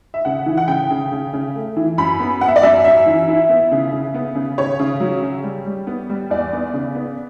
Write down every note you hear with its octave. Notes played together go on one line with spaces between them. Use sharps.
E5
C#3 F#5
E3
F#5
C#3 G5
C#3
C#3
C#3
A3
E3
F#2 B5
B3
B3 F#5
E5
D5
F#2 E5
F#2 E5
E3
E4
B3
C#3
C#3
B3
C#3
C#3 C#5
C#3
F#3
C#3
G3
G3
B3
G3
E2 D5
B3
C#3
B3